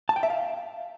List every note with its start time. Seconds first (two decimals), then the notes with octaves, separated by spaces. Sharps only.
0.09 A5
0.16 G5
0.23 E5
0.30 F5